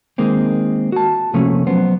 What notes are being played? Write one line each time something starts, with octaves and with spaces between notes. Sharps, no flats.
D#3 G#3 A#3 C4
F#4 A5
C3 F3 A3 A#3 C#4
F#3 B3 C5